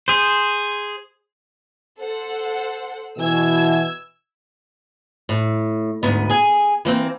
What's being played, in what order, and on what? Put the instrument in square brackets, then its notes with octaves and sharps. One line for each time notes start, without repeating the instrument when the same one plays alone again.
[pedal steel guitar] G#4 C5
[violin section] A4 C5 F#5
[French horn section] B2 E3 [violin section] E6 G#6
[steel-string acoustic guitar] A2
D2 G#2 B3
G#4 G#5
E3 A#3 C4